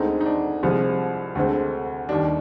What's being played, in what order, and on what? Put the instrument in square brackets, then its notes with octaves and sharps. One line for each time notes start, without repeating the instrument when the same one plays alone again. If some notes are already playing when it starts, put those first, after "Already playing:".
Already playing: [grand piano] D2 D3 G#3 C4 D#4
D#4
D4
C2 C3 F3 G#3
D2 D3 G#3 C4
D#2 D#3 G3 D4